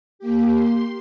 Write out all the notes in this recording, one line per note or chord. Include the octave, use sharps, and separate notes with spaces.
A#3 G4
C6